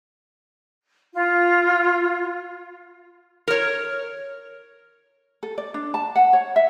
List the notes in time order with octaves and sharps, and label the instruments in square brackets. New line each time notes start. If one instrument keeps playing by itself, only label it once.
[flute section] F4
[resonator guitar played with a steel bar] A#4 C#5
[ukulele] A4
D5
D4
A5
F#5
C#5
E5